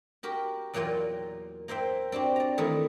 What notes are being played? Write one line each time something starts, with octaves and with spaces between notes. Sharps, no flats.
F#4 G4 A#4
E2 A#2 F#3 A#3 F4 G5
A#3 C5 E5 G5
C4 D4 F#4 G4
D5 A#5
D#3 E3 A3 D#4 E4